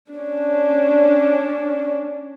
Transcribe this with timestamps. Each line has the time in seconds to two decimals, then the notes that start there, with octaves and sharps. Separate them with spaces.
0.11 C#4 D4